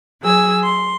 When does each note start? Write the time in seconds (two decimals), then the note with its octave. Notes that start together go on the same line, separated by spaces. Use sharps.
0.23 F#3 G#4 G#5 E6
0.63 C6